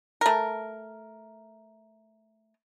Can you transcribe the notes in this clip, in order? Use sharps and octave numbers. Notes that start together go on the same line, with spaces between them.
A3 A#4